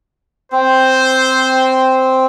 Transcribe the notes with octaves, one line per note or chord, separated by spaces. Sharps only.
C4 C5